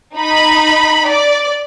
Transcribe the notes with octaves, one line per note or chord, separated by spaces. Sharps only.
D#4 B5
D5